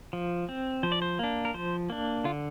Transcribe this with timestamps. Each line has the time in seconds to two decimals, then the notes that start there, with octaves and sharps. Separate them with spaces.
0.13 F3
0.49 C4
0.83 F3 C5
0.92 D5
1.02 C5
1.19 A#3 D4
1.45 A#4
1.54 F3 C5
1.90 A#3 D4
2.24 D3 F4